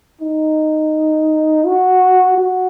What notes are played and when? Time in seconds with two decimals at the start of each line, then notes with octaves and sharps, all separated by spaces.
0.21 D#4
1.66 F#4
2.38 F#4